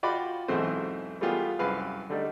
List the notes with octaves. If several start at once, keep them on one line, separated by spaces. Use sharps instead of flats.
F4 F#4 D5 G5 B5
B1 E2 G#2 A3 C4 C5
G3 A3 B3 F4 G4 G#4
C2 F#2 B4 F5
D3 G3 A3 D4 D#4